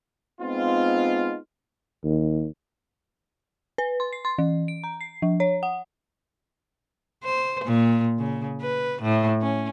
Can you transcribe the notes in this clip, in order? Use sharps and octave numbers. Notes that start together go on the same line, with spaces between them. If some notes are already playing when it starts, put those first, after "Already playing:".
G#3 B3 C4 D#4 F4
D#2
B4
C6
C7
C6
E3
D7
A#5
C7
F3
C#5
F#5
C5
A#2
C#3
B4
A2
C#4